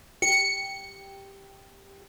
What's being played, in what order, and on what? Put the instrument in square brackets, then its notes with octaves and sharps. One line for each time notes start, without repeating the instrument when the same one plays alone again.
[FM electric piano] G4 [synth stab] C#7